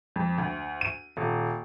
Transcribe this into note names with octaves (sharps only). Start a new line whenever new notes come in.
F2
D2
D#7
D#1